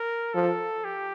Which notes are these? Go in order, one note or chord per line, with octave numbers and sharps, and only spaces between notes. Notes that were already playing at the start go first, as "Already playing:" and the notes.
Already playing: A#4
F3 A4
G4